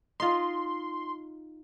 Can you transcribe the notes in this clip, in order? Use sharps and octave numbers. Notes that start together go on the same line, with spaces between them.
D#4 F4 C6